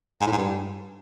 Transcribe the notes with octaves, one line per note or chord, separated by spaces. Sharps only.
G#2
A2
G#2
G2